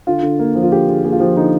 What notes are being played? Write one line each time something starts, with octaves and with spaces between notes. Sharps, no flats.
D3 F4
D3
A#3
F3
F4
D3 G4
D3 G#4
A#3 G#4
F4
F3 G4
D3 D#4